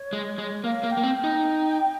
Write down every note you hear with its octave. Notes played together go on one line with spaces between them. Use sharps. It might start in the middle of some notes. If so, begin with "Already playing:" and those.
Already playing: C#5
G#3
G#3
A#3 F5
A#3
G5
A#3
C4
G5
D#4